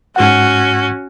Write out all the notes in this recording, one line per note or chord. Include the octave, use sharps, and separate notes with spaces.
G#2 C#4 F#4 F#5